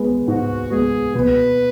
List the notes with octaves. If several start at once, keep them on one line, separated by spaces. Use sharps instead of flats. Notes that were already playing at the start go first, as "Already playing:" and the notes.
Already playing: G#3 B3
G#2 F#4
G#3 B3 G#4
B2 B4